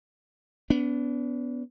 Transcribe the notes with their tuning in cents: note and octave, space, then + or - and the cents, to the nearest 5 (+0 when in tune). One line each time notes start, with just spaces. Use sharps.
B3 +5 D4 -40